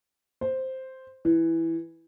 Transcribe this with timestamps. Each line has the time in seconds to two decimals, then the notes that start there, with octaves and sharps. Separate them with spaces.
0.41 C5
1.25 E3